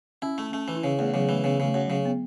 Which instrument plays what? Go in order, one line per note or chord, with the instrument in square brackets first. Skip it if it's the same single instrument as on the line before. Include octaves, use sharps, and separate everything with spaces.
[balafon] C#4 [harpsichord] E4
[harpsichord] A3
[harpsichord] A3 [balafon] C#4
[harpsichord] E3
[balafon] E4
[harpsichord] C#3 [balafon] C#4
[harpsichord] E2 [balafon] A3
[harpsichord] C#3 [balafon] F#3
[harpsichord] E3 [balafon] A3
[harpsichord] C#3 [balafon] B3
[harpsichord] C#3 [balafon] A3
[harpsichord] F#2
[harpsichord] C#3 [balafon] F#3
[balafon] B3